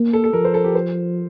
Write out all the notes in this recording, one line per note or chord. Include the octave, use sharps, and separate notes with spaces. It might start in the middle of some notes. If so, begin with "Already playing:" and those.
Already playing: A#3
A4
A4
F3 A#4
C5
A4
G4
C5